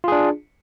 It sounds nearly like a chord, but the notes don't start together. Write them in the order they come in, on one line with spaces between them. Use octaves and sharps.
F4 G#4 D4